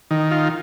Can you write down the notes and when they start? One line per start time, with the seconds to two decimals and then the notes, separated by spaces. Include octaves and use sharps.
0.11 D#3
0.31 F4